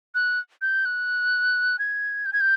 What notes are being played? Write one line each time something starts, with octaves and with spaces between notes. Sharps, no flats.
F#6
G6
F#6
G#6
G6
G#6
G6